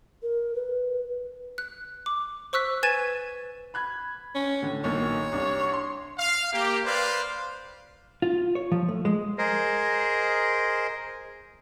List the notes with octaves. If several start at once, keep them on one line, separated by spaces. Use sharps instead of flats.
A#4
B4
F#6
D6
C5 C#6 E6 F#6 B6
B4 G#5 G#6 A6 D#7 E7
B5 F#6 G#6
C#4
A2 D3
B1 A#2 D#3 C#5
C2 D4
C6
F5
A#3 G4
B4 C5 D5 F5
F4
C#5
F3
A3
G#3
G#4 A#4 C5 D#5